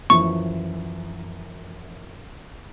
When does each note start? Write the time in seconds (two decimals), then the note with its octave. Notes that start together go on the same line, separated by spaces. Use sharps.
0.10 F#2 E3 F3 C#6